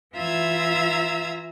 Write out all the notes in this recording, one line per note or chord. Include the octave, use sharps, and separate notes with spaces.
E3 F4 E5 A#5 E6 G#6